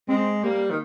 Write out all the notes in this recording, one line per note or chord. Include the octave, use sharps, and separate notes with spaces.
G#3 C4
G3 A#3
D#3